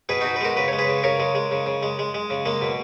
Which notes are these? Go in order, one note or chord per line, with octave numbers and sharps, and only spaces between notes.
B2 G#4 B4
B2 D#4 F#4
B4
G#3 F#4 A#4
C#3 B4
G#3 C#5
G#4 B4
C#3
C#3 A#4 C#5
G#3
G#3
C#3
C#3
G#3
G#3
G#3
C#3
G#3 A#3
B2